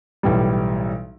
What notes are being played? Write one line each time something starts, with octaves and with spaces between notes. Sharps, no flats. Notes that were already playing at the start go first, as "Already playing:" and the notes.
B1 A2 E3 G3